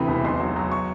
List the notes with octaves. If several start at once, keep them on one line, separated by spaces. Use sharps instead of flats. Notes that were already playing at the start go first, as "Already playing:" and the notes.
Already playing: D2 C3 E3 B5
E1
B1 C6
F#3
F#3
C#6